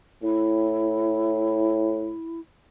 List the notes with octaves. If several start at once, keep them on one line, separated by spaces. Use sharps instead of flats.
A2 E4